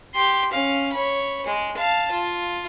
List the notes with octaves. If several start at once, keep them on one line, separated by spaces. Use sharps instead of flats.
G4 C6
C#4 F5
C#5 B5
G#3
F5 A5
F4